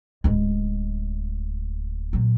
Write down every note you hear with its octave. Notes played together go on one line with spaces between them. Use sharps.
D1 G#3
A#2 F#3